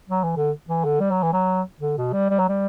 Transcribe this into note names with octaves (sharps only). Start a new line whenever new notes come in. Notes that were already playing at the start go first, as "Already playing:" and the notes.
F#3
E3
D3
E3
D3
G3
F#3
E3
F#3
D3
B2
G3
G3
F#3
G3